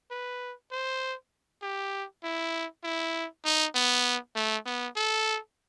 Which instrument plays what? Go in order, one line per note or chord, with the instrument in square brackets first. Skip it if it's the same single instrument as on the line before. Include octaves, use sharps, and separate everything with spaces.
[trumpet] B4
C5
G4
E4
E4
D#4
B3
A3
B3
A4